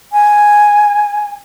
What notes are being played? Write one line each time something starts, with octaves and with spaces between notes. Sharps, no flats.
G#5